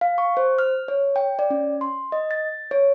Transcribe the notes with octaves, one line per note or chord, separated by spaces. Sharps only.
F5
C#6
C5
F6
C#5
G5
D5
C#4
C6
D#5
A6
C#5